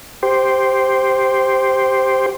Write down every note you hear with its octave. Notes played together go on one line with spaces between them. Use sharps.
G4 C5